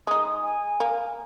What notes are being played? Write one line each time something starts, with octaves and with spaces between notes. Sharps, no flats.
G#3 D#4 D#6
G#5
A#3